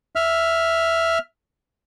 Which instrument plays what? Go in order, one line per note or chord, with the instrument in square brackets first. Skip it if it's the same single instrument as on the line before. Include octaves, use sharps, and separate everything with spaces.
[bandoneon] E5 F6